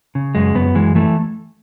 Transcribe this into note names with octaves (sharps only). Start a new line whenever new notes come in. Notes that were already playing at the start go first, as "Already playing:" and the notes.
C#3
F#2 G#3
F#2 B3
E3 G#3
E3 A3